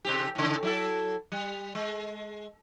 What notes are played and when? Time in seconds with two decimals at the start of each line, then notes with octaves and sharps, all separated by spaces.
0.05 C3 C4 G4
0.35 A2 C#3
0.63 F#3 E4 A4
1.32 G3
1.75 G#3